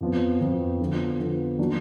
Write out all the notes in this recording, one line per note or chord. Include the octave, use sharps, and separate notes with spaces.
F2 F3 B3
F2 F3 B3
D3 F3 B3
D3 F3 B3
D#3 F#3 A#3 D4